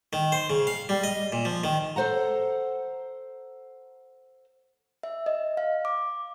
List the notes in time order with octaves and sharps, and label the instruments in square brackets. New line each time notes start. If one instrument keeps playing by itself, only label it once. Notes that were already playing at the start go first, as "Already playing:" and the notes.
[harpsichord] D#3
C5
C#3
F5
G3
D#5
A#2
F3
D#3
[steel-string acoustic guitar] A4 C5 F#5 A#5
[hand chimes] E5
D#5
F5
D6